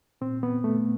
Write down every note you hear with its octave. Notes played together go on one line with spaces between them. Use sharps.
A#2 C4
B3
A3